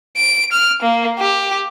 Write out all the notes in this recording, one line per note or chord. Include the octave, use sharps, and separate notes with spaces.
D7
F6
A#3
G4